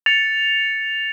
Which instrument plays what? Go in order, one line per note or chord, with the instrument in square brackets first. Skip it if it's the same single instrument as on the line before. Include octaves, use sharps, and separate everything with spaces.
[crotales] A6 C#7 F7